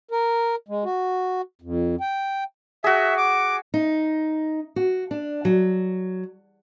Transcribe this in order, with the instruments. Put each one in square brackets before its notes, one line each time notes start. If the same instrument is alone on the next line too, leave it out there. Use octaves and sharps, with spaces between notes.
[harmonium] A#4
G#3
F#4
F2
G5
[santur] F#4 G#4 [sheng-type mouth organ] E5
[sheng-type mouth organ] D6
[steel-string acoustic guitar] D#4
F#4
D4
F#3